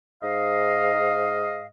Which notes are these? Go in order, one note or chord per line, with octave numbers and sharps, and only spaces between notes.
G#2 D#5 F5